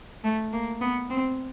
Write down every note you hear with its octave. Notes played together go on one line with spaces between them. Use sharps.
A3
A#3
B3
C4